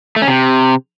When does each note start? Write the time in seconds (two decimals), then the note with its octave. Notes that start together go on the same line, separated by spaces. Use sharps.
0.16 A3
0.22 C#4
0.28 C3